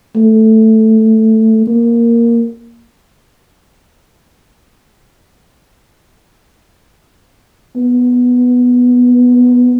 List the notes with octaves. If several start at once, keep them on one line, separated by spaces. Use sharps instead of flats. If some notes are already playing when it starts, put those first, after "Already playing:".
A3
A#3
B3